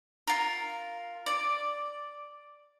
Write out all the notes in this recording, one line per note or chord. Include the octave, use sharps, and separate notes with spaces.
F4 A#4
D5